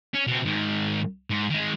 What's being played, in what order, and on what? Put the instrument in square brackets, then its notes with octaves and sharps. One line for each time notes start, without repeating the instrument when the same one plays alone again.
[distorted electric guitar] C#4
B2 C4
G#2 D#3
G#2
D#3 G#3